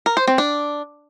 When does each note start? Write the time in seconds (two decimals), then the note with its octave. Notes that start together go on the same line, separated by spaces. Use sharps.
0.06 A#4
0.17 C5
0.27 C4
0.38 D4